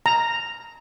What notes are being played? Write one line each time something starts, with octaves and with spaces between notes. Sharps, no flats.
A#5